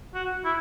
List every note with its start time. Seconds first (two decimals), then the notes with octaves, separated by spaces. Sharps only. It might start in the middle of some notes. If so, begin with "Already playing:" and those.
0.14 F#4
0.45 E4